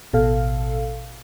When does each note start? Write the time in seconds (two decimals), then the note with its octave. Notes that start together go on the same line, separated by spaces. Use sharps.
0.13 A1 B2 A4 F5